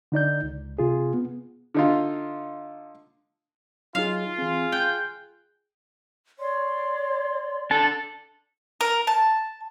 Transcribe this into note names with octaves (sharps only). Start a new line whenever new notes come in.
D3 D#4 D5 G6
C#2
C3 F4 G#4
B3
D3 D#4 F4
F#3 D#4 F4 G#4 F5
E3 C4 G#4
G5 F#6 G6
C#5 D5 C6
D4 A4 A5
A#4
A5